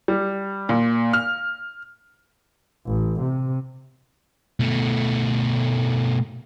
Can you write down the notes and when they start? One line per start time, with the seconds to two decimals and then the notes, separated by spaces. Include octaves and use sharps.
0.08 G3
0.69 A#2
1.13 F6
2.86 A1
3.21 C3
4.60 B2 A3